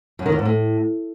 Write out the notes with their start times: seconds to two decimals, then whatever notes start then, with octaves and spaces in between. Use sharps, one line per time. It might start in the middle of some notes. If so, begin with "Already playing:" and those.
0.19 F#2
0.26 D#3
0.32 E2
0.39 G#2
0.45 A2